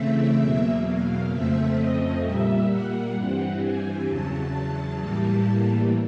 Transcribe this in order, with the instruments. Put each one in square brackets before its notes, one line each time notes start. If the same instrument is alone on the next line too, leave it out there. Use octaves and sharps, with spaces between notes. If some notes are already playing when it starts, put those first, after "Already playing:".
Already playing: [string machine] C#3 E3 A3 C4 E5
E2 B2 F#3 A#3
F5
F2 C#3 F3 A3 C4 E5
D#5
A#2 G3 A#3 E5
F#5
G2 E3 G3 C4
G#5
E2 C#3 F#3 A5
A2 E3 G3 A#3